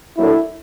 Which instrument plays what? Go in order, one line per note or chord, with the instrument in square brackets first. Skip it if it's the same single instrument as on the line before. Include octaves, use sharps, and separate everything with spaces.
[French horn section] F#3 A#3 D4 F#4 A4 [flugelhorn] E4